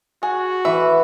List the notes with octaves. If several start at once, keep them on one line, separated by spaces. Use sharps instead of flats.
F#4 G#4
E3 E5